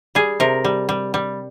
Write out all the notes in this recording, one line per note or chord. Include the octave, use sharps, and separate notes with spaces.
G3 G#4
C3 A#4
G3
G3
G3